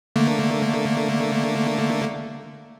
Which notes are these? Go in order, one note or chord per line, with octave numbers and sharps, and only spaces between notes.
D3 A3 A#3